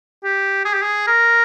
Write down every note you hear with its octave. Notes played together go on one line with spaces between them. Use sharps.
G4
G#4
G4
G#4
A#4